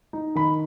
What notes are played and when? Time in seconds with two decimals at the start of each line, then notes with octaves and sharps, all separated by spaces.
0.13 D#4
0.35 D#3 B5